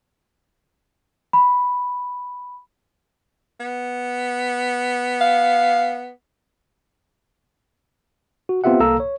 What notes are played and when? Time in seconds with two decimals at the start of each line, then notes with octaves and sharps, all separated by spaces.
1.33 B5
3.60 B3
5.21 F5
8.49 F#4
8.64 B3 C4 F4 G4 E5 F#5
8.80 C2 A#3 A4 F5 A#5 E6
9.00 C#5